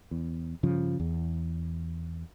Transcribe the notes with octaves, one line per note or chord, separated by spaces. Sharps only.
E2
G2 C#3 F3
E2